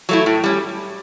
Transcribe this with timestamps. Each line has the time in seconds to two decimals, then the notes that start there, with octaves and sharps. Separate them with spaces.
0.09 F#3 A3 E4
0.26 A2
0.44 G3 C#4